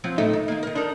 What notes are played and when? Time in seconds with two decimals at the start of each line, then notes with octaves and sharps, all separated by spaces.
0.04 F3 F#3 C4
0.18 A2 A3 D#4 E5
0.33 D#3
0.48 D#3 A#3
0.63 D#3 A#4
0.75 D4 D#4 A#4